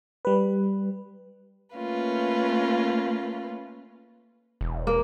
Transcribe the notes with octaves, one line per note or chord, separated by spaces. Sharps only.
G3 B4
A3 A#3 C#4 F4 B4
E1
A#3